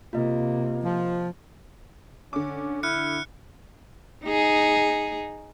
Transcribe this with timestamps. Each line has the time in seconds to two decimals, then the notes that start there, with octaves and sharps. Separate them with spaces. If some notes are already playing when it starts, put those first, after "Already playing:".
0.13 C3 A#3 F4 D#5
0.84 F3
2.33 D3 C#4 D6
2.83 E4 F6 F#6 C#7
4.25 D#4 G#4